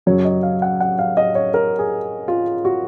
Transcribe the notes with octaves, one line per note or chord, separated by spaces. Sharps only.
F#2 C#3 F#3 C#5
D#5
F5
F#5
F#5
F5
D#5
C#5
A#4
G#4
F4
F#4